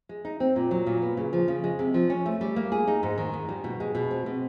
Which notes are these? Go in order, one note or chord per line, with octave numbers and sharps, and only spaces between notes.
G#3
D#4
C4
A#2
F#3
A#2
B3
C#3
F3
C#3
G#3
C3
F3
C#4
A3
G3
A#3
G#4
D#4
G#2
D#3
G#2
G3
B2
G#3
B2
C4
B2